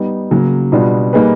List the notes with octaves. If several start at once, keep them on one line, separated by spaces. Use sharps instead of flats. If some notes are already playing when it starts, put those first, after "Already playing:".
Already playing: G3 B3 D#4
C#3 F#3 A#3
B2 G3 B3 D4 F4
G3 A#3 D#4 G#4 B4